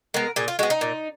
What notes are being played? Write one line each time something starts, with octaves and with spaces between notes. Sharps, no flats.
G#3 B3 A#4
A#2 G#4
F4
G#3 B3 F#4
D#4
A#2